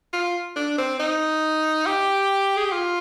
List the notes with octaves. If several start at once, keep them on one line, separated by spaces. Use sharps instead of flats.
F4
D4
C4
D#4
G4
G#4
G4
F4